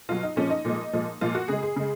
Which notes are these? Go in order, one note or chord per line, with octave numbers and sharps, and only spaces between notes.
B2 F#3 F4
D#4
A#2 F3 G#3 C#4
D#4
A#2 F3 G#3
A#2 F3 G#3
A#2 F3 G#3 F4
F#4
C#3 G#3 G#4
G#4
C#3 G#3